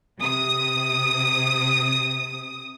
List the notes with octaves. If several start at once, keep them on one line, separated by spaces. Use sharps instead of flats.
C3 D#6